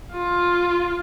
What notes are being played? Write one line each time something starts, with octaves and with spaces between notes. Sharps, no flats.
F4